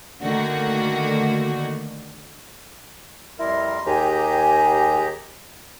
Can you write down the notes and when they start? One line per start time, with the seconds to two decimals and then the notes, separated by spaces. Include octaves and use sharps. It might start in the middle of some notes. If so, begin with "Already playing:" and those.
0.21 D3 D#3 A3 A#3 F#4
3.39 F2 G3 E4 A#4 C6
3.86 D#2 G4 G#4 G#5 A#5